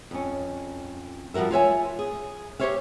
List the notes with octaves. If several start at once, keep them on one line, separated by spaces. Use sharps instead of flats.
F2 C#4
F3 G3 F#4 A#4 E5
F4 C#5 E5 G#5
G#4
G4 A4 C5 C#5 E5 F5